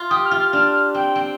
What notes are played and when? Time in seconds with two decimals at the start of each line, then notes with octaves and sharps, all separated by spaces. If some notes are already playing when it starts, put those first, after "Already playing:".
Already playing: F4
0.10 G4 D#6
0.24 F6
0.31 F4
0.39 F6
0.53 D4 F6
0.73 F6
0.95 C4 G5
1.16 C4